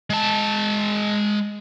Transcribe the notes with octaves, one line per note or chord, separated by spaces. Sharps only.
G#3 A5